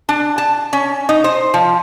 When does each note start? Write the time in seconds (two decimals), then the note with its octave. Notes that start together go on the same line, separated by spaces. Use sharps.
0.09 D4
0.38 A5
0.73 C#4
1.09 D#4
1.24 C5
1.54 F3